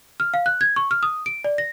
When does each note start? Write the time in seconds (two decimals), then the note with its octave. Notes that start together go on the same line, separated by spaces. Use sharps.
0.20 F6
0.34 F5
0.46 F#6
0.61 G#6
0.76 C#6
0.91 F6
1.03 D#6
1.26 D7
1.44 D5
1.58 A#6